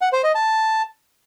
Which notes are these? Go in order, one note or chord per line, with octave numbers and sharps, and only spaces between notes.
F#5
C5
D#5
A5